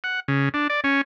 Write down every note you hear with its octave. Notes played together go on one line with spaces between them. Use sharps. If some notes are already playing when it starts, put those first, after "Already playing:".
F#5
C#3
D4
D5
C#4